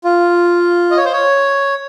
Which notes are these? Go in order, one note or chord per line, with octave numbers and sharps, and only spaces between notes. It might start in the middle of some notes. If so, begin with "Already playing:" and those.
F4
D#5
C#5
C5
C#5